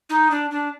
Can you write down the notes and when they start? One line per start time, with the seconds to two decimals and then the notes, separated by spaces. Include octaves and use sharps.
0.09 D#4
0.31 D4
0.51 D4